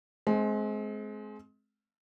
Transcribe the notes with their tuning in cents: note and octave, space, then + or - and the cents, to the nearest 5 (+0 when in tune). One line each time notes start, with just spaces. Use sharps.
G#3 +30 C4 +0